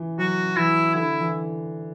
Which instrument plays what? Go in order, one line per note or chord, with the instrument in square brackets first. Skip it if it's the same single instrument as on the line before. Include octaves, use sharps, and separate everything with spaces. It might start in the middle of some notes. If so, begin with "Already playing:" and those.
Already playing: [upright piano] E3
[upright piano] F#3 [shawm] F#4
[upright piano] E3 [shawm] E4
[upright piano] D3 [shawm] E4
[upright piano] E3